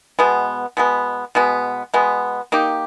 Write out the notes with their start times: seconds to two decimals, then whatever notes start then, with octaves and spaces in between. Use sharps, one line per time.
0.19 B2 G#3 B3
0.77 B2 G#3 B3
1.35 B2 G#3 B3
1.94 B2 G#3 B3
2.52 A#3 D#4 G4